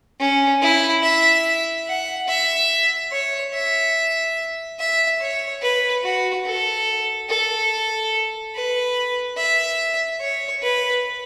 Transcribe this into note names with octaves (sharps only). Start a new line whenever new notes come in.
C#4
E4
E5
F#5
E5
C#5
E5
E5
C#5
B4
F#4
A4
A4
B4
E5
C#5
B4